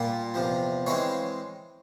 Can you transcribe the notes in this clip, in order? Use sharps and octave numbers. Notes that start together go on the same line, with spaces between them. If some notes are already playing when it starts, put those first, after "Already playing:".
Already playing: A#2 G3 A#3 F4
E2 C3 F3
E3 G#3 C4 C#5 F5